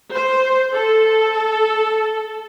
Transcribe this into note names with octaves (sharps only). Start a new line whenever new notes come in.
C5
A4